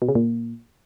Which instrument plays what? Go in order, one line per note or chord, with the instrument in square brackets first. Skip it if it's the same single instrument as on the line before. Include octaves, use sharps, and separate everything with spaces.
[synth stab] B2
C#3
A#2